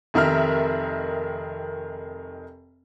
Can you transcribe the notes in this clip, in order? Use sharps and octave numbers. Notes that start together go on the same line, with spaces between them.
F1 D#3 A#4 E5 F6